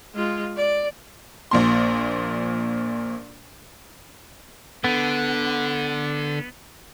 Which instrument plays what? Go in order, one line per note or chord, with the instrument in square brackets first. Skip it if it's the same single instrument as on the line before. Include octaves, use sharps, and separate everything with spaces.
[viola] G#3 F4
D5
[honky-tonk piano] A#1 A#2 C6
[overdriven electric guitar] D3 [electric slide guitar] B3